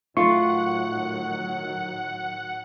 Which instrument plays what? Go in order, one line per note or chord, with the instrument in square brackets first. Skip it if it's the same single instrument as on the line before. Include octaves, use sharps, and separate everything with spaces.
[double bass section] A2 D#3 F#3 [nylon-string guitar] A3 F4 [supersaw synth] F#5 [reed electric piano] C#6